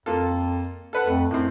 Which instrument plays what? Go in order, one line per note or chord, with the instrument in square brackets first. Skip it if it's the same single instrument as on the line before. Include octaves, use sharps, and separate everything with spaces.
[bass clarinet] F2 [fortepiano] A#3 F4 A4
[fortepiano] A4 B4 F#5
[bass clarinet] F2 [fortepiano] A3
[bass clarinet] F#2 [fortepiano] A2 C4